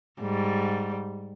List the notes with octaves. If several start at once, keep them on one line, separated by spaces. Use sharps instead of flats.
G#2 G3